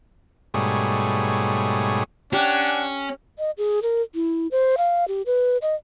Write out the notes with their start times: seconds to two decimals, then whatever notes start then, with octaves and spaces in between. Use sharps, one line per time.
0.54 G#2 B2 G3 A3 G#4 C#5
2.33 C#4 D4 G4 F#5 G#5 F#6
3.39 D#5
3.58 G#4
3.83 A#4
4.15 E4
4.51 C5
4.78 F5
5.08 G4
5.26 B4
5.62 D#5